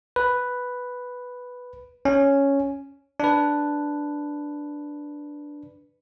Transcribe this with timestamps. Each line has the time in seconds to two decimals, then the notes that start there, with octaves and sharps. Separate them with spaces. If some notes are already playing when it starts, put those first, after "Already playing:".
0.16 B4
2.05 C#4
3.20 D4 B4